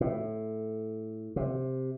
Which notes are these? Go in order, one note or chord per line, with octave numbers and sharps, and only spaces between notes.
A2
C3